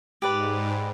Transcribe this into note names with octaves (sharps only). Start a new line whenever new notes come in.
G#2 G4 B4 D5